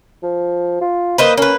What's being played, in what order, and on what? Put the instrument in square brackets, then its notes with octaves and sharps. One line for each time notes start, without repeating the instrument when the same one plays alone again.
[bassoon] F3
F4
[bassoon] A#3 [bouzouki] B4 C5 D#5
[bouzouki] A#3 B4 [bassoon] C#4